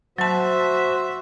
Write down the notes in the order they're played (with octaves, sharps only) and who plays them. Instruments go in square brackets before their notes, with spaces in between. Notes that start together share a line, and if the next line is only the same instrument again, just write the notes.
[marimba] F#3 A5 [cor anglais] F#4 [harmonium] C5 [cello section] E5